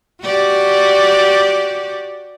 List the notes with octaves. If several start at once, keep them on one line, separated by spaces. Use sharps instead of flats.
F#4 G4 D5